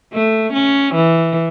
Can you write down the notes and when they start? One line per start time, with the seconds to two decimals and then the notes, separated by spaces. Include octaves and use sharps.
0.13 A3
0.53 C#4
0.95 E3